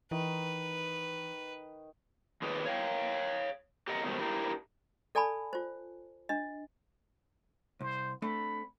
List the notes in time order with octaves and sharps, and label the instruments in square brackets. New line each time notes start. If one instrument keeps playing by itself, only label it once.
[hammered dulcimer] D#3 [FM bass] E3 [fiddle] B4
[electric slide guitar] D#3 F4 G#4 B4 C#5 D5
C#5 F5 G5
G4 A4 A#4 D#5 F#5
G#2 B2 D#3 G3 A3
D4 E4 G4 A#4
[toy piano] A4 D5 G#5 A5 B5
F4 C5
D4 D#5
[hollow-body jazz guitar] C2 [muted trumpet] C5
[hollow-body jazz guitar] A3 C4 D4 [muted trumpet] B5